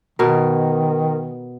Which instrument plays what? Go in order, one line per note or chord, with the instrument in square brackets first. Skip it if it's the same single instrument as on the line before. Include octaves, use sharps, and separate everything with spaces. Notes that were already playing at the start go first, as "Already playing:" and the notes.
[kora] B2 A#4 [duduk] D#3